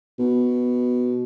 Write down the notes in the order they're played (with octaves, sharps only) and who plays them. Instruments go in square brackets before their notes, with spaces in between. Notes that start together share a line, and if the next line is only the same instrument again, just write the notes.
[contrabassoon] B2